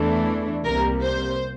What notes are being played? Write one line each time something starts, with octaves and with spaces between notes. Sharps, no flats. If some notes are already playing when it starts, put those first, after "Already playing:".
Already playing: E2 E3 A3 D4
C2 C3 G3 A#3 A#4
C5